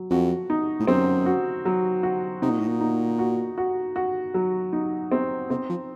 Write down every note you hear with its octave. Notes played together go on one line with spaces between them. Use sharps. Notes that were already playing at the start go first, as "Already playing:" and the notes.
Already playing: F#3
F2 F#4
D#4
A2
F#2 C4
F#4
F#3
F#4
C3 D#4
A#2
A2
A#2
D#4
F#4
F#4
F#4
F#3
D#4
C4
C3 C4
F3